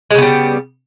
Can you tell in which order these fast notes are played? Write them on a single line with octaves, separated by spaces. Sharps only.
G#3 C#3 B3 G3